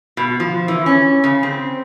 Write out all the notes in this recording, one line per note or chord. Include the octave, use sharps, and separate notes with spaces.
B2
F3
E3
C#4
C#3
C4